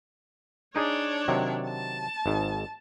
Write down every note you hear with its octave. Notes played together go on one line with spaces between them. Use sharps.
D4 D#4 G#4 C#5 D5
C3 D#3 F#3
A5
G#1 G#2